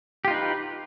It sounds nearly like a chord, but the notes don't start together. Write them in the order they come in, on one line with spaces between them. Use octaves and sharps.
G4 F4 D#4 B4